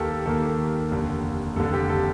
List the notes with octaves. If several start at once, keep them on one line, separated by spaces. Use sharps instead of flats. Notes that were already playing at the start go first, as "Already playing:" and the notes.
Already playing: D#2 D#3 A#3 G4 A4 A#4
A4
D#2 D#3 A#3 A4
F1 D#2 D3
F1 D#2 D3 A4
G4
A4